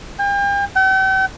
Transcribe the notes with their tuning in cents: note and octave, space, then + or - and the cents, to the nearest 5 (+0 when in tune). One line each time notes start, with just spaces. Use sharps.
G5 +40
G5 -45